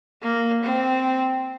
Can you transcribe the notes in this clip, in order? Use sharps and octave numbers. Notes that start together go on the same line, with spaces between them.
A#3
C4